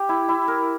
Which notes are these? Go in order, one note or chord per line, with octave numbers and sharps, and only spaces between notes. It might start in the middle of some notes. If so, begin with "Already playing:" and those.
Already playing: G4
E4
E4
A#4